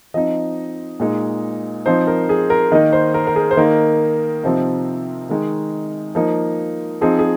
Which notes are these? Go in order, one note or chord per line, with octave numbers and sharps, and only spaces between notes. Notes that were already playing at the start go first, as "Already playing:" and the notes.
F3 C4 D#4 D#5
A#2 G#3 D#4
F3 C4 D#4 C5
A#4
G#4
A#4
D#3 A#3 D#4 D#5
C5
A#4
A#4
G#4
C5
D#3 A#3 D#4 A#4
C3 F3 C4 D#4
D#3 G#3 D#4
F3 A#3 D#4
F3 C4 D#4 G#4
G#4